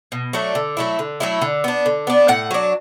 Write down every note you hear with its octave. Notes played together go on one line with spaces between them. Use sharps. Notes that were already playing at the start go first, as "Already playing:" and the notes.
B2
F#3 A3 D4
D3
F#3 A3 E4
D3
F#3 A3 E4
D3
B3 D4
D3
B3 D4
A2 F#5
F#3 D4